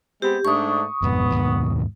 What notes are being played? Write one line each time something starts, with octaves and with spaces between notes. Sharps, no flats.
G#3 B3 C4 G4
G#2 A3 D4 C#6 D#6
F2 G#2 B2 B3
D#2 G#2 B2